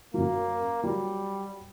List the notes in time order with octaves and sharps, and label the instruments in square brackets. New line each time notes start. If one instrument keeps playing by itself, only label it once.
[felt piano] F#2 F#3 [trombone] A#3
[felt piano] F#3 [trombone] G3